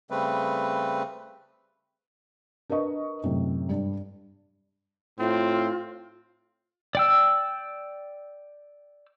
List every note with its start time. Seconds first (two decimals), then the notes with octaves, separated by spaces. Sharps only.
0.11 C#3 G3 A3 C4 B4
2.70 D4 A#4 B4 D#5 C#6
3.24 F#2 A2 C3
3.69 G2
5.19 A2 C4 F4
6.95 D5 G5 E6